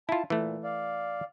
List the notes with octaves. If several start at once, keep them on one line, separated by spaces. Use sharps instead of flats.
E4 F4 A5
A#2 E3 A3
D5 F5